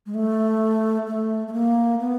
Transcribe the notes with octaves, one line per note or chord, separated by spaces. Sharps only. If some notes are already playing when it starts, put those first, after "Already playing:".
G#3
A3
A3
A3
A#3
B3